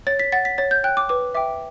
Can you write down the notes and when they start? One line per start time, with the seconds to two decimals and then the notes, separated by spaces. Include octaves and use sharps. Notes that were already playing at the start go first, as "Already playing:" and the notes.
0.07 C#5 A6
0.19 B6
0.32 F#5 A6
0.45 B6
0.58 C#5 A6
0.71 G6
0.84 G5 F#6
0.97 D6
1.09 B4 D6
1.35 E5 G5 D6